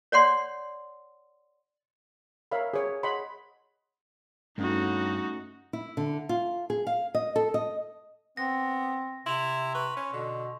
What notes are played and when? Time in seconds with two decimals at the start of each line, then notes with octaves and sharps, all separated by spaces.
0.12 C#5 D5 F#5 C6
2.51 A#4 C#5 E5 F5 B5
2.74 G#4 C#5
3.03 G#4 C#5 D#5 F#5 B5 C6
4.58 G2 A3 C#4 D#4 F#4
5.73 E4
5.97 D3
6.29 F4
6.70 G#4
6.87 F5
7.15 D#5
7.36 A4
7.54 D#5
8.37 B3 C4 A#6
9.26 C3 E4 C6 F7
9.75 B4 C#6
9.97 C#4
10.13 B2 D3